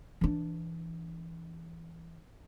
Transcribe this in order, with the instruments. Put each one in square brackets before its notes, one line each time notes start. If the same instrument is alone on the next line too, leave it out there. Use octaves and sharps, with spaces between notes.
[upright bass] E3 D4